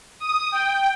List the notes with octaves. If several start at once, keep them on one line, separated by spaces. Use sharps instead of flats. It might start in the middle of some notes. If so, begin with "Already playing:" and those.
D#6
G5